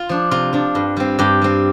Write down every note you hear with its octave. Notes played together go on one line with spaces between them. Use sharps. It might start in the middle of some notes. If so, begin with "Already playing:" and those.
Already playing: F4
F3 D4
C3 F4
F3 D4
G2
G3 C4
G2 G4
G3 C4